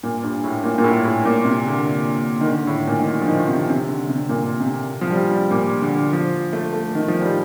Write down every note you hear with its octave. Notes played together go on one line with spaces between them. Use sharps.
A#2
G2
A2
A#2
A#2
A2
A2
A#2
C3
D3
D#3
D3
A2
A#2
D#3
D3
F3
D#3
C3
C3
D3
C3
A#2
C3
F3
G3
G3
A#2
D3
F3
A3
A3
D#3
F3
G3